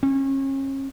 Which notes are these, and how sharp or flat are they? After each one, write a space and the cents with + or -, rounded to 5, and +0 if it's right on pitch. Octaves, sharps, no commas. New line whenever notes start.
C#4 -35